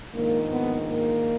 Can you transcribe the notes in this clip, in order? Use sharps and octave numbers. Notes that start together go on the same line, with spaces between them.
A#1 G#2 D#3 A#3
B3
A#3